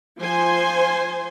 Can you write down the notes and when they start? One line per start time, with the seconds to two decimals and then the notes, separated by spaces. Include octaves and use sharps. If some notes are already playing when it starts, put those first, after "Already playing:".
0.20 F3 C5 G#5 C6